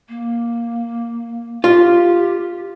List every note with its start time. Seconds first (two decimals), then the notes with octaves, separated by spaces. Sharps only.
0.09 A#3
1.64 F4 G4